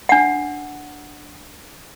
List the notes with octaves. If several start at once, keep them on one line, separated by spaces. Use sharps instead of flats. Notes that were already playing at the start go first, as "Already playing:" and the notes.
D4 F#5